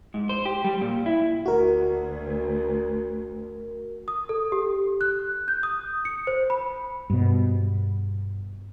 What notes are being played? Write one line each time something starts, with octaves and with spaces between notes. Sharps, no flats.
G#2
C5
G4
G3
A#2
E4
D2 F#4 A#4
D#6
A4
G4
F#6
G6
D#6
C#7
C5
B5
G2 B2